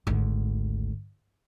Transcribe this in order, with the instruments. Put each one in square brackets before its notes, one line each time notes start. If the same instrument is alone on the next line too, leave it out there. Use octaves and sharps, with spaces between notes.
[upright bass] G#1 D2